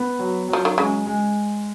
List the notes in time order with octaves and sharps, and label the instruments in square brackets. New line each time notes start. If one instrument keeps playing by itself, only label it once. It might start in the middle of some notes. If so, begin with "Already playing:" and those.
Already playing: [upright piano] B3
F#3
[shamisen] F3 [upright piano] F#3
[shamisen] D#3
[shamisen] C#3 [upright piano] G#3
[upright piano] G#3